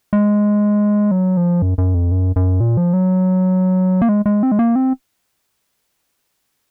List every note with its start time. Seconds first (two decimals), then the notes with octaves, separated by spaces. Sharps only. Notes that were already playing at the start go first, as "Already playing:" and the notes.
0.13 G#3
1.11 F#3
1.37 F3
1.62 F#2
1.78 F#2
1.94 F2
2.12 F#2
2.36 F#2
2.60 A#2
2.77 F3
2.93 F#3
4.02 A#3
4.09 G#3
4.26 G#3
4.43 C4
4.52 G#3
4.59 A#3
4.76 C4